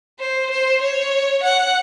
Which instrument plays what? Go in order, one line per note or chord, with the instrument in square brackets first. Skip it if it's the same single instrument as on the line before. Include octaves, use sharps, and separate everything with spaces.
[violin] C5
C5
C#5
F#5